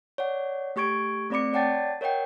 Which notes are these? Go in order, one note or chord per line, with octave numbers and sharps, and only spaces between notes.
C#5 D5 F#5
A3 G4 C#6 G#6 D7
A3 C4 D5 B5 D6 C#7
C#5 D5 F#5 G5 A5 A6
A#4 C#5 D#5 F#5 G5